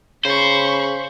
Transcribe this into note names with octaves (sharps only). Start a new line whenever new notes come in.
C#3 C5 B5 C#6